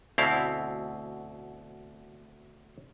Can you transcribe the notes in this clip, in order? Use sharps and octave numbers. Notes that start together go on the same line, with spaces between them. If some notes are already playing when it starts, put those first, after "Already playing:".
D2 B2 C4 E4 F5